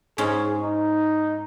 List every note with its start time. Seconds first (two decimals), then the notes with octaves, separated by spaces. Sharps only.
0.18 G#2 C#4 G#4
0.63 D#4